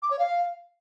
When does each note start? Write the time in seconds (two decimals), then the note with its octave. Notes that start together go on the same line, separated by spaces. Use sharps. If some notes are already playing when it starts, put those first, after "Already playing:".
0.02 D6
0.11 C#5
0.19 F5